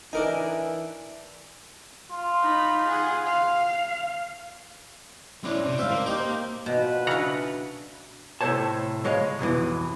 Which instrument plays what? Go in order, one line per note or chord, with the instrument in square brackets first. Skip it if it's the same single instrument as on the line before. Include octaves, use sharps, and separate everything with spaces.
[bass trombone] E3 [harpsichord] D4 A#4 G#5 [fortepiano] D#4
[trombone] F4
[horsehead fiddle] D#4 B5
G#4 F#5
F5
[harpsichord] A2 D4 [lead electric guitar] C#4 C5
[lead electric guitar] C3
[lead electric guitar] D2 G#2 [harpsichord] C5 E5 F5
[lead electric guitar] A#3
[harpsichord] D#4 G4 C5
[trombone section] D2 F4 B4 [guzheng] B2
[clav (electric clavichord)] C#3 F#5 A#5 [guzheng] D4 E4
[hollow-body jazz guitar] A2 C3 A4 C5 C#5 A5
C#3 G#3 C#5 D#5 F5
C2 F2 B2 E3